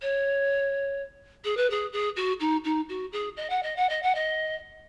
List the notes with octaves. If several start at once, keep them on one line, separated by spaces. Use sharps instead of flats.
C#5
G#4
B4
G#4
G#4
F#4
D#4
D#4
F#4
G#4
D#5
F#5
D#5
F#5
D#5
F#5
D#5